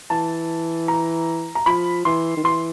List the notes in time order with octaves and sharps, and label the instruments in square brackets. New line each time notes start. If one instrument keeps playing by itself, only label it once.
[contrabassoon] E3 [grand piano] A5
[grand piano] A#5
A#5
[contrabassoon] F3 [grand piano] B5
[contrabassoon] E3 [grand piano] C6
[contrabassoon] D#3
[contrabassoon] E3 [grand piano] C6